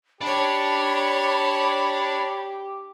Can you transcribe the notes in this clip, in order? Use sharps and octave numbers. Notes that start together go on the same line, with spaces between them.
D4 G4 C#5 D5 A5 B5